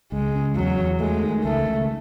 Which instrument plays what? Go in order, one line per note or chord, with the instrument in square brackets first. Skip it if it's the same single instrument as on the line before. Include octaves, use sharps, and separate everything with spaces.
[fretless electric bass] C#2 [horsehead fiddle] G#3
[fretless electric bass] C#3
[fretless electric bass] E2 [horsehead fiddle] F#3
[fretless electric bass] E2
[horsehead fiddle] G#3 [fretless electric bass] A3
[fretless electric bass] D#3
[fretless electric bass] C#2 [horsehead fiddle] A3
[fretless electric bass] C#2